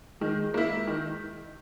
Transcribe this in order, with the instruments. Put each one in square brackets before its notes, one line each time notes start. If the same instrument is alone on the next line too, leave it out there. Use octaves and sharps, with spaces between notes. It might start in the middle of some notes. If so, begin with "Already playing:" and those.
[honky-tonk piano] D#3 [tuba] G#3
[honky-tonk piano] A#3 E4
D#3